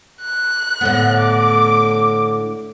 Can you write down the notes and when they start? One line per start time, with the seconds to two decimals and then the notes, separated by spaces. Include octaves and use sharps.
0.22 F#6
0.81 A2 D3 B3
1.18 D6